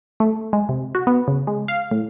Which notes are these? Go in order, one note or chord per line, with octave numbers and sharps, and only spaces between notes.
A3
G#3
C3
F#4
B3
C#3
G#3
F5
A2